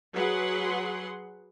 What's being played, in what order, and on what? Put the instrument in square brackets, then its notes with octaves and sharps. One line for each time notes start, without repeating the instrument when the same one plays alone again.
[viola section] F#3 G#4 B4 F#5 C6